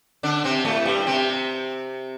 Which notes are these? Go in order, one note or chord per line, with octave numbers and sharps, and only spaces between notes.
D3 D4
C3 C4
A2 A3
G2 G3
C3 C4